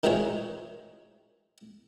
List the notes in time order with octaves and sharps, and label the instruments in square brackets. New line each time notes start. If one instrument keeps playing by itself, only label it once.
[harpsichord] D#3 E3 G#3 F4 F#4 C#5